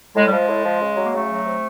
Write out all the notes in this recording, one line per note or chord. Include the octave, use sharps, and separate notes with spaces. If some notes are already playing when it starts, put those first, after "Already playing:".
A2 G#3
G3
F3 G#3
A2
F3
C#3
F#3
A#3
C#3 A3
F#3
C3